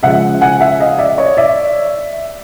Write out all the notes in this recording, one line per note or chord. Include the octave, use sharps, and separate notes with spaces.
C#3 F3 G#3 E5 F#5
F#5 G#5
E5 F#5
D#5 F5
D5 E5
C#5 D#5
D5 E5